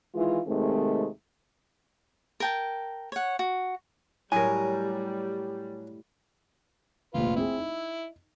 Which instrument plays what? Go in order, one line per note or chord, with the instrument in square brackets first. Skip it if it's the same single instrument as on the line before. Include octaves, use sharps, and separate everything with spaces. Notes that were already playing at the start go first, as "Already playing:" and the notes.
[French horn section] D#3 E3 G#3 E4 F4
D#2 C3 D#3 G#3 A3 C4
[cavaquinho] A#4 G5 A5
C#5 F#5
F#4
[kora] A2 A#4 [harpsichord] F#3 [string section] G3 [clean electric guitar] G#5
[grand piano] F1 A#1 [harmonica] F4 B4
[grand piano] C4 G#4 [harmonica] E4
[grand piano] D#4